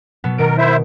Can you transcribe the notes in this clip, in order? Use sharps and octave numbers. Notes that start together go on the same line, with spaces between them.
B2 F#3 B3
B2 D#3 A#4 D7
E4 C5 E5